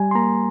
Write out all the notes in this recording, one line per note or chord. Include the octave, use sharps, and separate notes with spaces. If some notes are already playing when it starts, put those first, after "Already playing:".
Already playing: G3 G#5
C6
A#3 A#5